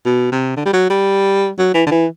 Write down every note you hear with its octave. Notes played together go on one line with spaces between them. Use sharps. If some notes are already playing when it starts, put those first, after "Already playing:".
B2
C3
D3
G3
F#3
G3
F#3
E3
D3
E3